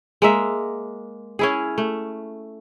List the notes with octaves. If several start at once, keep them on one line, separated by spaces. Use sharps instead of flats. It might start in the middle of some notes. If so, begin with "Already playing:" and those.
G#3 A#3 E5
C#4 E4 G#4
A3